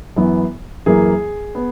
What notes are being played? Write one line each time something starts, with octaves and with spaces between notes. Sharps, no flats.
F#2 E3 B3
F#2 E3 A#3 G#4
B3